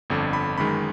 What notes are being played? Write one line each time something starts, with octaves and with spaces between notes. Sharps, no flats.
G1 F2 D3
B5
G1 F#2 D#3 G#3 B5